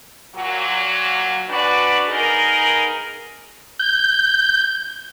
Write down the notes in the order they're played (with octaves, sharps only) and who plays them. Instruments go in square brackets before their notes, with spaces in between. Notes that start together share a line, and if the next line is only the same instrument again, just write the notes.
[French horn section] A#2 F#3
C#4 D4 F#4 B4 D5
B3 D#4 G#4 A#4
[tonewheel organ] G6